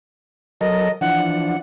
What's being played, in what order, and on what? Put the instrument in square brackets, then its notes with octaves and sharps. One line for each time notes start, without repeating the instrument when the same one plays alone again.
[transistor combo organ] F#3 A4 A#4 [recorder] D#5
[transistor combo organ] E3 F3 D4 [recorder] F#5